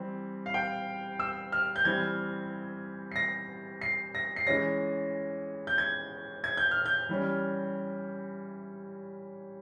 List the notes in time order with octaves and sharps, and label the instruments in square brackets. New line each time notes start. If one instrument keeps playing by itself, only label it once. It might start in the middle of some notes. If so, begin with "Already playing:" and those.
Already playing: [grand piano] E3 G3 C4
F5
G5
E6
F6
G6
E3 G3 C4 G#6
C7
A#6
C7
A#6
C7
E3 G#3 C#4 A#6
G6
G#6
G#6
G6
F6
G6
E3 G3 C#4